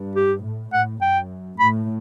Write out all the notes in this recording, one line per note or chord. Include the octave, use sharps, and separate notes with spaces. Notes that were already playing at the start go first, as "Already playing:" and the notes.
Already playing: G2
G4
A2
A2 F#5
F#2 G5
A2 B5